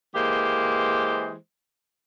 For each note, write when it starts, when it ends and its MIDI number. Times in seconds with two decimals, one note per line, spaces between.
0.14 1.34 52
0.14 1.34 56
0.14 1.34 58
0.14 1.34 67
0.14 1.34 72